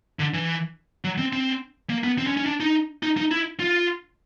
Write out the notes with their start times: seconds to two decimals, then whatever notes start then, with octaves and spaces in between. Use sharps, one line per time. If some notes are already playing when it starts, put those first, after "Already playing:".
0.19 D3
0.34 E3
1.04 F#3
1.18 C4
1.33 C4
1.90 A#3
2.04 B3
2.18 C4
2.27 C#4
2.37 C#4
2.46 D4
2.60 D#4
3.03 D#4
3.17 D#4
3.31 E4
3.60 F4